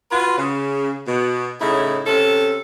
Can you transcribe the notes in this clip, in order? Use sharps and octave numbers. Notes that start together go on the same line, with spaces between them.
F4 F#4 B4
C#3
B2
A2 C#3 D#4 E4
C3 C#4 A4